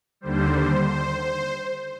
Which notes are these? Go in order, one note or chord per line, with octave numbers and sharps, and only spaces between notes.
D#2 D3 G3 C5
C5
C5
C5